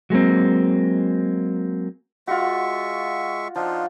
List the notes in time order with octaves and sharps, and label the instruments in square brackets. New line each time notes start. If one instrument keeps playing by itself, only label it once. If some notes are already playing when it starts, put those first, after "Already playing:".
[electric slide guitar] F#3 G#3 A#3 C4
[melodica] G#3 E5 C#6 [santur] F4 F#4
[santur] F3 [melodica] D4 D#4 F4